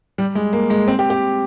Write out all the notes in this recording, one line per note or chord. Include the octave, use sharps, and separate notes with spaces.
G3
G#3
A#3
G#3
C4
G4
G4